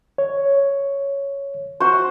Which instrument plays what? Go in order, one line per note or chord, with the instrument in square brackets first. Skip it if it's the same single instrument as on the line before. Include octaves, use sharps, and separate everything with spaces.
[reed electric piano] C#5
[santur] F#4 C5